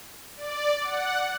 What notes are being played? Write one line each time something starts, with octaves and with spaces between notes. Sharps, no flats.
D5
F#5